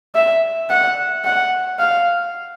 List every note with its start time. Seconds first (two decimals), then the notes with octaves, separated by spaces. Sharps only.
0.15 E5
0.70 F#5
1.25 F#5
1.79 F5